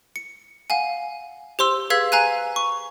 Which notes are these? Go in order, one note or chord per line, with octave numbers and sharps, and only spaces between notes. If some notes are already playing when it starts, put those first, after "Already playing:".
C#7
F5 F#5 G#5
G4 C5 C6 E6
G#4 B4 F5 E6 G#6 B6
F5 G#5 A#5 F#6 D#7
C#6